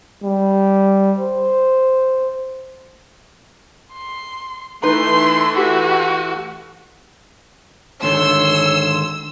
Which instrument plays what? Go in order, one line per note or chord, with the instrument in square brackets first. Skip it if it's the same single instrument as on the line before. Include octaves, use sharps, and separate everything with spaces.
[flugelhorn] G3
C5
[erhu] C6
[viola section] E3 A3 [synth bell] D#4 B4 [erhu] C6
[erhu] F#4 [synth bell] G4
[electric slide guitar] G#2 D3 D#3 [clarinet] C#5 [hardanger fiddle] C6 [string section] E6